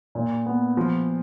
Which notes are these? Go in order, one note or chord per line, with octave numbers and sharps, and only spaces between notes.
A#2
B3
F3